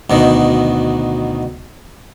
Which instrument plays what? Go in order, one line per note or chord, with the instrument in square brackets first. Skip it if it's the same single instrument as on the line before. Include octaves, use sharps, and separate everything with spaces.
[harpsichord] D2 B2 D#3